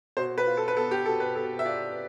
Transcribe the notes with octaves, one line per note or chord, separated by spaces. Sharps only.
B2 C5
B4
F4
A4
B4
B3 A4
G4
B2 A4
B4
B2 A4
E5
F4 D5